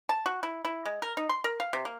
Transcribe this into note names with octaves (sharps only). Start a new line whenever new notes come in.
A5
F#4
E4
E4
G#3
A#4
D#4
C6
A#4
F5
C3
A#3